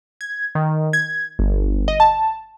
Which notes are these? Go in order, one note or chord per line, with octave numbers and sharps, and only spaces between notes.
G#6
D#3
G#6
G1
D#5
A5